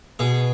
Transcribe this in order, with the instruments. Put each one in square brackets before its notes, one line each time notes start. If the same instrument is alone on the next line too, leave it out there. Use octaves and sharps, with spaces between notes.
[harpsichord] B2 G#4